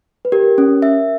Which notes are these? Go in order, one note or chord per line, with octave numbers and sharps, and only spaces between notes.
B4
G4 A#4
C#4
E5